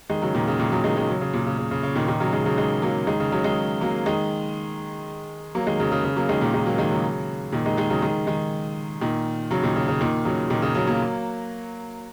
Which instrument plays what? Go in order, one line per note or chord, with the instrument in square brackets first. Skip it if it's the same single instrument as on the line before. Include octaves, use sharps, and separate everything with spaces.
[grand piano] D#3 G#3
C#3 F#3
A#2 D#3
C#3
A#2 D#3
C#3 F#3
D#3 G#3
D#3 G#3
C#3 F#3
C#3
A#2
C#3
C#3
C#3
C#3
A#2 D#3
A#2 D#3
C#3 F#3
D#3 G#3
C#3 F#3
D#3 G#3
F#3 A#3
D#3 G#3
C#3
C#3 F#3
D#3 G#3
F#3 A#3
D#3 G#3
F#3 A#3
D#3 G#3
C#3 F#3
C#3
C#3
F#3 A#3
D#3 G#3
A#2 D#3
D#3 G#3
F#3 A#3
D#3 G#3
C#3 F#3
A#2 D#3
D#3 G#3
D#3 G#3
C#3 F#3
D#3 G#3
D#3 G#3
A#2 D#3
C#3 F#3
A#2 D#3
C#3
C#3
A#2 D#3
C#3 F#3
A#2 D#3
C#3
C#3 F#3
F#3 A#3